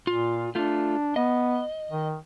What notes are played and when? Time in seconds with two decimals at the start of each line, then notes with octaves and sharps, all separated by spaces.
0.07 A#2 F4
0.55 A3 D4 F4
1.16 B3 D#5
1.91 D#3